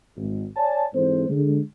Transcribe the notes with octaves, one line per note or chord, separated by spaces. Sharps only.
G#1
C#5 D5 G#5 A5
G#2 E3 C4 A4 C5
D3 G#3